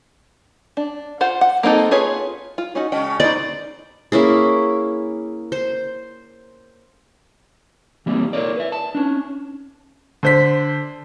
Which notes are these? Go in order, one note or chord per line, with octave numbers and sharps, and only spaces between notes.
D4
F4 C5 F#5
F#5
A#3 C4 D#4 A4
F4 G#4 B4 C#5
F4
C#4 D#4 F#4
C#3 G#3 C#4 D#5 G5
B3 D#4 C5 D5 D#5
A#3 C#4 E4 G#4
C5
E3 G3 A#3 C4
A#4 C#5 D5
B4 E5
A5
C#4 D4
D3 C5 B6